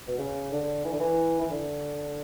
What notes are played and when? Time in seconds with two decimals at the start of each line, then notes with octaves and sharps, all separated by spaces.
0.07 B2
0.18 C#3
0.52 D3
0.85 E3
0.92 D3
1.00 E3
1.41 E3
1.50 D3